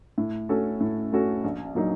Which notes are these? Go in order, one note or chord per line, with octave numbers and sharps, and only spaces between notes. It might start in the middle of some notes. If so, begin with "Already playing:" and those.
A2
A3 C#4 F#4 A4
A2
A3 C#4 F#4 A4
A#1
A#2 F#3 A#3 D#4